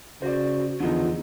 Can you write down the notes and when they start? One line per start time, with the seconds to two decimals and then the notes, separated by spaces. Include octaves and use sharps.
0.22 C#3 F#4 C5 D5
0.80 E2 D3 F3 D#4 F4